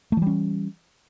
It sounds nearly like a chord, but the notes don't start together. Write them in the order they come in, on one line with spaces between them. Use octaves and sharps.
A3 E3 G3 C#4